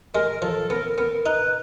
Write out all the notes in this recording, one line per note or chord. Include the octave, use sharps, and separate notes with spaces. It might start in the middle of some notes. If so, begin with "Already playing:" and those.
G#3 A#4
F3 A4
B3 A#4
B3 A#4
D#4 B4